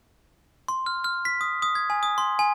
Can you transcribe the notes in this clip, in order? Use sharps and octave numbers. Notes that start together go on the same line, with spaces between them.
C6
F6
F6
B6
D#6
D#6
G#6
G#5
D#6
C6
G#5